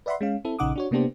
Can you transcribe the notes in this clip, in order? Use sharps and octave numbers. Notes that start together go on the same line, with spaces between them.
B4 D5 E5 F#5 B5 C6
G#3 C#4 F5
C4 E4 A4
A#1 C#3 D#4 F#5 D6 D#6
D4 F#4 C#5
C3 A#3 B3 D4 G4 C5